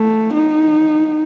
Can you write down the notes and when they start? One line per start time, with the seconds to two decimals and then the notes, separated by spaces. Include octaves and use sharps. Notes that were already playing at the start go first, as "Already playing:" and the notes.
Already playing: A3
0.34 D#4